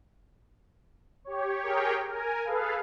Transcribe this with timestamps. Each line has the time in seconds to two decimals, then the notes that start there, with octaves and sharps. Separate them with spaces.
1.24 G4 C#5
1.62 G4 G#4 A#4 C#5 G5
2.08 A#4 G#5
2.44 G#4 A4 B4 F5